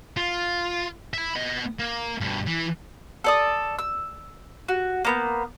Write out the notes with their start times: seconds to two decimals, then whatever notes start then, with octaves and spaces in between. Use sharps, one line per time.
0.17 F4
1.14 E5 B5
1.35 B3 D#5
1.79 A#3
2.21 G2 B2
2.47 E3
3.24 A4 D5 D#6
3.79 E6
4.68 F#4
5.05 A#3 B3 G6